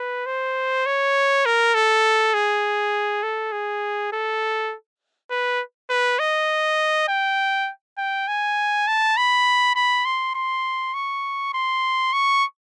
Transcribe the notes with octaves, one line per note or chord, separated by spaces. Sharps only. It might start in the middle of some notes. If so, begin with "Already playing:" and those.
Already playing: B4
C5
C#5
A#4
A4
G#4
A4
G#4
A4
B4
B4
D#5
G5
G5
G#5
A5
B5
B5
C6
C6
C#6
C6
C#6